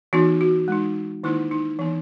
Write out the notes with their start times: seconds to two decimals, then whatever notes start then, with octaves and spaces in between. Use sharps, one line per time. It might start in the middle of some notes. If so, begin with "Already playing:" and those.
0.13 E3 B3 D#4 F#4
0.41 F#4
0.68 G#3 D#4
1.24 D#3 A#3 D#4 E4
1.51 D#4
1.79 E3 B3 D#4